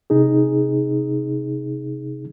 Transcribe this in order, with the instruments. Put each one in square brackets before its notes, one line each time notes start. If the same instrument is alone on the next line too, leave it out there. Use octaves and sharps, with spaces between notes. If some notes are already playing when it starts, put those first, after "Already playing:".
[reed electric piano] C3 D#4 G#4